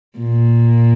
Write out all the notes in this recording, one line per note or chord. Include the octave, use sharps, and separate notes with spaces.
A#2